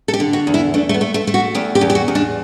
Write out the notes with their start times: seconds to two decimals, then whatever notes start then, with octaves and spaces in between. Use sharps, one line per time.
0.08 A4
0.14 G4
0.20 D3
0.33 F#4
0.47 E2
0.54 E4
0.74 A3 D4
0.89 A3
0.94 B3
1.01 A3
1.14 A3
1.27 A3
1.34 F#4
1.55 E2 G4
1.75 G4
1.81 E2
1.90 G4
1.95 F#4
2.08 E2
2.15 D4